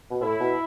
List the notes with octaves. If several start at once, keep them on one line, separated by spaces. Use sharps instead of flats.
B2
A2 E4
B2